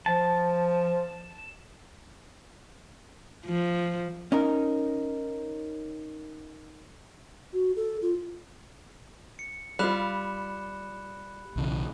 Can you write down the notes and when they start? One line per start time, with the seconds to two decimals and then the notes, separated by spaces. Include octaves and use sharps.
0.06 F3 A5
3.46 F3
4.32 C#4 D#4 A#4
7.53 F#4
7.76 A4
8.02 F4
9.39 C#7
9.79 G3 F4 B5 F#6 E7
11.56 B1 C#3 E3